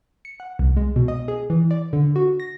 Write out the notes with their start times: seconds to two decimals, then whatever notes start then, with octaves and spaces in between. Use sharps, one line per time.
0.25 C#7
0.40 F#5
0.59 C2
0.77 G#3
0.96 B2
1.08 D#5
1.28 G#4
1.50 E3
1.71 D5
1.93 D3
2.16 F#4
2.40 A#6